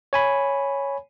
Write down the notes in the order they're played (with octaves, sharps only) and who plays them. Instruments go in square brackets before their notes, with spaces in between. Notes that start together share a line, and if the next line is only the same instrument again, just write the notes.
[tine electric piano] C#5 G#5 B5